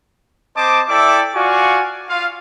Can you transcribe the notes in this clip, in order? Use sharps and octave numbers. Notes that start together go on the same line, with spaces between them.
C4 C5 D#5 A5 D6
E4 A4 D5 E5 G5 D6
F4 F#4 D5 F5 G#5 C#6
F4 F5